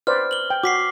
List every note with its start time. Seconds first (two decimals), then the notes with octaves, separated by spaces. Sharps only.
0.07 B4 C5 D5 F6
0.31 F#7 G7
0.50 G5
0.64 F#4 D6 B6 C7